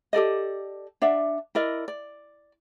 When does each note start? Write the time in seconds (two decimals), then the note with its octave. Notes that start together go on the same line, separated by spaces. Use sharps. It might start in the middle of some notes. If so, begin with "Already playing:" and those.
0.13 G4 A4 D5 D#5
1.02 D4 D5 E5 F#5
1.55 E4 A#4 D5 D#5
1.88 D5